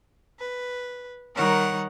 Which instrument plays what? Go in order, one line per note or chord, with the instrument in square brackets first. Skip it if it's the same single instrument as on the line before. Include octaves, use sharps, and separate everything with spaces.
[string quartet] B4
D#3 G3 A#4 C#5 F#5